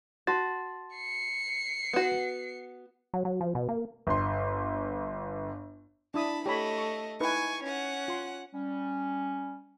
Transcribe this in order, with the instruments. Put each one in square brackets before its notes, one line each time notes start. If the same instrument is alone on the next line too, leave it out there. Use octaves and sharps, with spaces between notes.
[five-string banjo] F#4 [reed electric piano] A5 C6 A6
[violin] C7 C#7
[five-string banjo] B3 F#4
[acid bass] F#3
F#3
F3
B2
A#3
[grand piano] G1 C6
[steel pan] D4 E4 D#6 [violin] A5 B5
[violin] A3 D#5 [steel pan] G4 C#5 B5
[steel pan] C#6
[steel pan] D#4 E4 B4 [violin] G#5 C#6
[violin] C#4 F#5
[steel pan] F4 C6
[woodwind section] G3 C#4